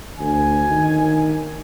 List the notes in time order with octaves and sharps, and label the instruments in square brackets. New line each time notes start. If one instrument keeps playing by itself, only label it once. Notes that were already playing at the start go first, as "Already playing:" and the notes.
[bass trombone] D2 [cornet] G#5
[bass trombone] D#3